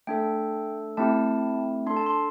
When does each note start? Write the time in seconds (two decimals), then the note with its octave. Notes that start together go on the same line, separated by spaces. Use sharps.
0.07 A3 D4 A4 G5
0.97 A3 C4 E4 G4 A5
1.86 D4 A4 C6
1.97 A5
2.06 C6